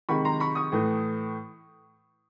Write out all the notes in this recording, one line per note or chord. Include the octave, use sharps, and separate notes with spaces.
C3 D#3 G#3 B5 C#6
A#5 C6
B5 C#6
C#6 D#6
A2 E3 A3